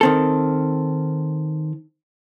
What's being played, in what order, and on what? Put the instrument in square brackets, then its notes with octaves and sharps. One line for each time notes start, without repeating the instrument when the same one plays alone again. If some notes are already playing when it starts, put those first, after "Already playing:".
[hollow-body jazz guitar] D#3 C4 A4